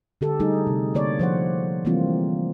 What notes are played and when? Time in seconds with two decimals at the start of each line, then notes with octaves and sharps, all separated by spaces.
0.21 D3 G4 A4
0.40 G3 A3 D#4 G#4
0.67 C3
0.94 D3 A#3 C#5 D5
1.19 F3 C5 C#5 F#5
1.85 E3 G3 A3 A#3 C4 F4